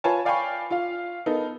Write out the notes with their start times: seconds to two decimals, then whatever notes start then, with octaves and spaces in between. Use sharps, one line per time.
0.04 F4 B4 C#5 G#5 A5
0.25 D5 F5 G5 G#5 B5 C#6
0.70 F4 F5
1.26 B3 D#4 A4 A#4